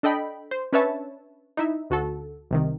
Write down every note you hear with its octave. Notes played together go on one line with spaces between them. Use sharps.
D4 A4 D#5 G5 B5
C5
C#4 D4 B4 C#5 E5 A5
D#4 E4 E5
D2 F#4 A4
C2 C3 D#3